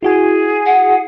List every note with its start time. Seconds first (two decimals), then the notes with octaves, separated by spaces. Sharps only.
0.03 E4 F#4 G#4 G#5
0.66 F#5